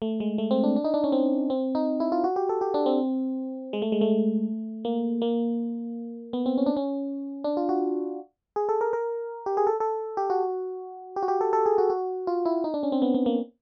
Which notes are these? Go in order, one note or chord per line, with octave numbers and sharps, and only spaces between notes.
A3
G#3
A3
C4
D4
D4
D#4
D4
C#4
C4
C4
D#4
E4
F4
F#4
G4
A4
G4
D4
C4
G#3
A3
G#3
A3
A#3
A#3
B3
C4
C#4
D4
C#4
D4
F4
F#4
G#4
A4
A#4
A#4
G4
G#4
A4
A4
G4
F#4
G4
F#4
G4
A4
A4
G#4
F#4
F#4
F4
E4
D#4
D4
C#4
C4
B3
B3
A#3